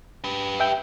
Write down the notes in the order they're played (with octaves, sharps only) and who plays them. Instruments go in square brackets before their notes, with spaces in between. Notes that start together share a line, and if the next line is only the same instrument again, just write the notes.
[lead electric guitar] G4 B4
[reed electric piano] E5 G5